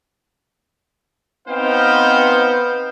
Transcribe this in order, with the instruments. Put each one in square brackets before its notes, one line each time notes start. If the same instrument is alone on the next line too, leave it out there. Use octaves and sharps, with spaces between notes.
[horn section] B3 C4 D#4 C5 F5 G5